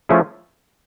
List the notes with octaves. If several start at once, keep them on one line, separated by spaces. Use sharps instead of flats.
F3 A3 C#4 E4 G#4